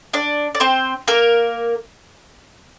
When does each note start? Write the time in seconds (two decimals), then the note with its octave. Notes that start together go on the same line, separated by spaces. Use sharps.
0.14 D4 D5
0.55 D5
0.60 C4 C5
1.08 A#3 A#4